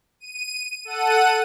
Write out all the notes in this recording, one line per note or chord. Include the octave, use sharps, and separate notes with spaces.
D#7
A4 F#5 D#7